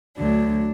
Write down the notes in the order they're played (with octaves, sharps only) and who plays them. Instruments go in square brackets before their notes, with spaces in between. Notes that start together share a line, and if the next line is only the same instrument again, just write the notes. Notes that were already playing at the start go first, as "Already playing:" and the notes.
[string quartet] D2 D3 F#3 D4